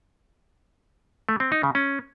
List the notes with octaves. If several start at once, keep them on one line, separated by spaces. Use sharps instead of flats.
A3
C4
D#4
C#3
C#4